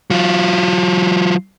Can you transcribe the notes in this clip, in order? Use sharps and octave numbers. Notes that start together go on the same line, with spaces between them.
F#3 F4